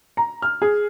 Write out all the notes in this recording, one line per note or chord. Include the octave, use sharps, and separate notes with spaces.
A#5
F6
G#4